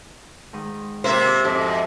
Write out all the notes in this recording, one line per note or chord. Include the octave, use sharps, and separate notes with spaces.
G#2 D#3 D#6
C3 A#3 F4 G4 C5 E5
F2 G#2 F#4 A4 E5